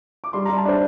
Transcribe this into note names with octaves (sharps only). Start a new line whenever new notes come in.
D6
G3 C6
A#5
G3
A5
D4 C5